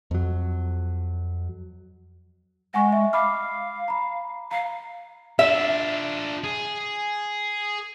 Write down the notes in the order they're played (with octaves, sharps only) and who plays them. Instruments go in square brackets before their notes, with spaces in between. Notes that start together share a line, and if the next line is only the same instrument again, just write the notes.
[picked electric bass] F2 F#3
[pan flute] G#3 [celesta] F#5 G#5 C#6
[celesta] E5
[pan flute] F5 [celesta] B5 D6 F6
[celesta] A#5 B5
[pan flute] F5 [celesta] A#5
[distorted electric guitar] D4 F4 [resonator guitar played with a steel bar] E5
[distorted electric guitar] G#4